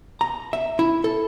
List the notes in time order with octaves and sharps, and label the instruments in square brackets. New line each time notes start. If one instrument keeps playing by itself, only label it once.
[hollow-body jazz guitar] A#5
E5
E4
A4